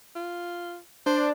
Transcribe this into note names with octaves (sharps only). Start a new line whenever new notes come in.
F4
D4 C5